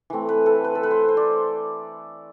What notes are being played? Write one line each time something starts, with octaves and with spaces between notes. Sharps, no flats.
E3 A3 C4
B4
A4
B4
A4
B4
C5
C5
D5